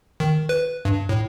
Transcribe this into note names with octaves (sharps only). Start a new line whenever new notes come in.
D#3
B4
G2
A2